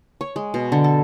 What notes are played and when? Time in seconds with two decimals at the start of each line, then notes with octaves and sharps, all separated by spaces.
0.21 C#5
0.36 G#3
0.54 B2
0.72 D3
0.84 A4